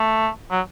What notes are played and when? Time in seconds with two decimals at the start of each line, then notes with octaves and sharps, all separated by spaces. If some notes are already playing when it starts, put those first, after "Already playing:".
Already playing: A3
0.51 F#3